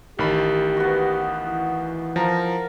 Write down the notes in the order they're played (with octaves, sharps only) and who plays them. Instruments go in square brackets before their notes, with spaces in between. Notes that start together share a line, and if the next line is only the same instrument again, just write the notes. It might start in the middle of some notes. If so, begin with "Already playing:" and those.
[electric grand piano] A1 D#3 B5 [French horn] G4
[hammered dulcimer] B3 F#4
[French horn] E3
[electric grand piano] F3 [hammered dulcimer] A#4 F5 A#5